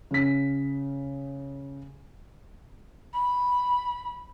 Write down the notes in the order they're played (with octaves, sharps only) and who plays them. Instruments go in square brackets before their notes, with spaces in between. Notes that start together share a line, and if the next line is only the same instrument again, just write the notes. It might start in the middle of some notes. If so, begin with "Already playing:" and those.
[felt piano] C#3 B6
[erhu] B5